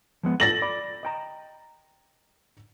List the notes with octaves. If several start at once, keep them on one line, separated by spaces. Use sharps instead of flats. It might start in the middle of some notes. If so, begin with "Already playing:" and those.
F3 G#3 B3
A4 A6 A#6 F#7
D5 B5
D#5 G5 A#5